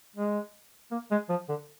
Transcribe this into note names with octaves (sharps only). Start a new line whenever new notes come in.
G#3
A#3
G#3
F3
D3